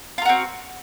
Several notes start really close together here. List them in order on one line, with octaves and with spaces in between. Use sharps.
F4 A#4 F#4 C4